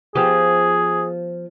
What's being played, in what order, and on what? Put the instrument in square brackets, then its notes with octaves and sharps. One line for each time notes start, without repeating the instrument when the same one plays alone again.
[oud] F3 B3 G4 [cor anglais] G#4